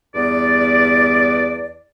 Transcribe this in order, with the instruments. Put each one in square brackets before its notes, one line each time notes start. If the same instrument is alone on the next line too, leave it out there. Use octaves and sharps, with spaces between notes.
[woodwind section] E2 G2 B3 D5